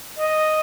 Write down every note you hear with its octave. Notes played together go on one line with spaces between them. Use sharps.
D#5